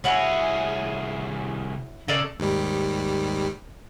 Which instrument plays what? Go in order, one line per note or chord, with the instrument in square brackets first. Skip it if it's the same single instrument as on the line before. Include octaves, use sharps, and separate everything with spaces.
[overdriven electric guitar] C2 G#4 [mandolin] E4 F#4 C#5
[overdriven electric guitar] C#3 [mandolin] A4 A#4 D5
[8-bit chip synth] D#2 G#2 G3